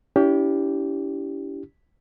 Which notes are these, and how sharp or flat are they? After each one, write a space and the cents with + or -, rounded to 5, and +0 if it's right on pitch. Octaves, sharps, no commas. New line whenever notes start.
C#4 +45 E4 +0 G4 +0